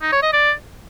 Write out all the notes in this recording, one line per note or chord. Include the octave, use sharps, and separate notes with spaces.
D#4
C#5
D#5
D5